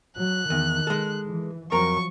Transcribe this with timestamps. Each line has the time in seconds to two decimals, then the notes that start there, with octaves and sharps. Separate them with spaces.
0.17 F#3 F#6
0.50 E2 D#3
0.87 G#3 A4
1.28 E3
1.72 F2 F3 F#3 A#4 A#5 C#6